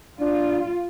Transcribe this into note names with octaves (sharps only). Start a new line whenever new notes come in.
D4 F4